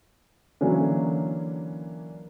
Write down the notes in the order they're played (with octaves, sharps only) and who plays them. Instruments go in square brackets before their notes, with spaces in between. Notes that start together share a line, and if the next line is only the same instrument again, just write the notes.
[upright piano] D3 E3 F#3 A#3 C#4 D4